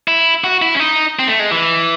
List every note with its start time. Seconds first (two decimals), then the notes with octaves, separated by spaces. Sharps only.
0.08 E4
0.44 F#4
0.62 E4
0.75 C#4
0.80 D#4
1.19 C4
1.28 A3
1.40 G#3
1.52 E3